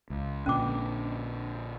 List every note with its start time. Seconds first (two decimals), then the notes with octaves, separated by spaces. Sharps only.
0.10 C#2
0.46 A#1 A#2 D3 C#4 D6